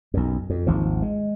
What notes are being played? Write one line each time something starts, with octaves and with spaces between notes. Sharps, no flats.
B1 F#2
F2
G#1 D#2 F3
G#3